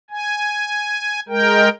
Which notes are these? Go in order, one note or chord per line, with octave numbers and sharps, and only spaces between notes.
G#5
G#3 A#4 G5